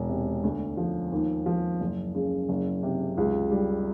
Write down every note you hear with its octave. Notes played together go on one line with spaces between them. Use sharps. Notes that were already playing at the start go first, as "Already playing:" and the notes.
Already playing: E1
C3
D2
F3
D#2
F3
F#1
C#3
F#1
C3
C#2
G3